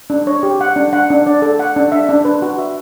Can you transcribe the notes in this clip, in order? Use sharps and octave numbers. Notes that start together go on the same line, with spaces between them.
D4
C#5
G4
F#5
D4
F#5
D4
D5
A4
F#5
D4
E5
D4
B4
F#4
E5